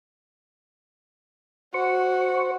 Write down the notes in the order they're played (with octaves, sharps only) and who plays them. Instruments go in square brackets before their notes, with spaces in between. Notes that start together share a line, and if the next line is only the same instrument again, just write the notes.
[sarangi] F#4 [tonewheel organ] C5 C#6